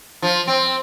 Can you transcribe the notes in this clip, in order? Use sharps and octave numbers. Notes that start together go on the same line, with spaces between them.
F3
C4